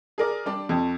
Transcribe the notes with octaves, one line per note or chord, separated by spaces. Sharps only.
G#4 A#4 D5
G3 D4 D5
F2